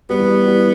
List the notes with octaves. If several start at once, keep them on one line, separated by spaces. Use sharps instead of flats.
G3 B3
E3
G3
G3
E3